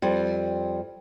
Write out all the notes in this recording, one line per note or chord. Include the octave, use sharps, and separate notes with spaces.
F2 G3